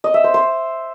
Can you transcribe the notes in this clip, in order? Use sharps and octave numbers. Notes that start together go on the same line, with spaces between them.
D#5
E5
C5
C5